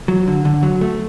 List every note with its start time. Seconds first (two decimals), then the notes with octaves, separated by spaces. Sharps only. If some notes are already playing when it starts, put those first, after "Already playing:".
0.08 F#3
0.28 D3
0.45 D3
0.63 F#3
0.81 A3